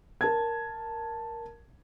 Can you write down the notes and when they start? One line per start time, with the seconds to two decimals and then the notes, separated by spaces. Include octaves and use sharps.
0.21 A#4 A5 G#6